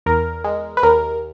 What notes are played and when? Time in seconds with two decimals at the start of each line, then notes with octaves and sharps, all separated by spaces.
0.06 E2 A#4
0.44 G#3
0.77 B4
0.83 D#2 A#4